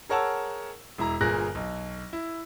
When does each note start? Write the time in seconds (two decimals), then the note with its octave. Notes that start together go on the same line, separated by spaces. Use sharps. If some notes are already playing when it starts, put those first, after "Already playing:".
0.09 G#4 A#4 C#5 F#5 A5 E6
0.98 E1 E4 A#5
1.21 G1 A#2 G#4 A#4 F#6 A#6
1.55 B1
2.13 E4